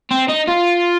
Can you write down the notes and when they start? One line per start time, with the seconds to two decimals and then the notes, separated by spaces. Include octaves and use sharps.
0.11 C4
0.29 D#4
0.48 F4